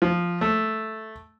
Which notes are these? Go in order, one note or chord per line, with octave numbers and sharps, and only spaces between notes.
F3
A3